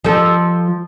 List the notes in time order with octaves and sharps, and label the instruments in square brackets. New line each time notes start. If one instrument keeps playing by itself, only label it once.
[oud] F3 A4